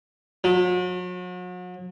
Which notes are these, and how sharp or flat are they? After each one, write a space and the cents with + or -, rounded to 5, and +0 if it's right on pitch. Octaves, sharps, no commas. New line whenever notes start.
F#3 -40